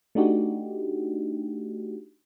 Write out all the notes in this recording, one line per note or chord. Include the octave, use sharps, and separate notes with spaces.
A3 D4 D#4 F#4 G4